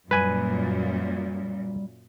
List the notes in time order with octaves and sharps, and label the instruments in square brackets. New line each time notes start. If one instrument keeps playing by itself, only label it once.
[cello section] F#2 A#2 [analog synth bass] G3 [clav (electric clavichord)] B4 G#5